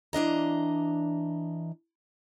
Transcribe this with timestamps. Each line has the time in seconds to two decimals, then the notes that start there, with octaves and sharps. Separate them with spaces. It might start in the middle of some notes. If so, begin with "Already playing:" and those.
0.13 E3 D4 D#5 A#5